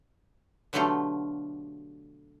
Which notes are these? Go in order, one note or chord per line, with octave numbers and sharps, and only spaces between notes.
B2 D3 F#3 A3 F4 G4